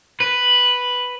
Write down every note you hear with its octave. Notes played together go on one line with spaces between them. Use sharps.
B4